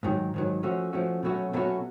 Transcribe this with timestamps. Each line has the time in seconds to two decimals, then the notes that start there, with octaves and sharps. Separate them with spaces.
0.03 G#2 D#3 F#3
0.34 G#2 D#3 F#3
0.63 F3 A3 C#4 F#4
0.93 F3 A3 C#4 F#4
1.23 B2 F#3 A3 C#4 F#4
1.53 B2 F#3 A3 C#4 F#4